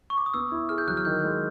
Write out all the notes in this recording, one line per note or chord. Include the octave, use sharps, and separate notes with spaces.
C#6
D6
D#6
B3 E6
E4
G#4 F6
G6
F#3 F#6
F6
D#3 G6
G#3